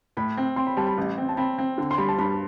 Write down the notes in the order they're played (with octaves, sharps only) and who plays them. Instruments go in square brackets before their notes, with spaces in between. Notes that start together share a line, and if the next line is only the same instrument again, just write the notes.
[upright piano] A2 [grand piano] B5
[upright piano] C4
[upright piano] C4 [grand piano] C6
[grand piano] B5
[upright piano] G3 [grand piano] A5
[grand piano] B5
[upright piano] A1
C4
[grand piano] A5
[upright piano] C4 [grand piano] B5
[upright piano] C4
D3
[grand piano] C6
[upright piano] G3 [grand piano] B5
[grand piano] A5
[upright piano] G2 [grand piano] B5